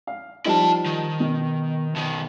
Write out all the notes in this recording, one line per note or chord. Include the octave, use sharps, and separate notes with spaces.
F5
F3 G3 D#4 E4 A5
D#3
B2
B2 D#3